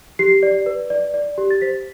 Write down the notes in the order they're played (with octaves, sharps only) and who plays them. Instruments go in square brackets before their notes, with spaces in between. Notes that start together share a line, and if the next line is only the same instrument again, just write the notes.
[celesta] G4 C7
D5
B4
D5
D5
G4
A6
C5 B6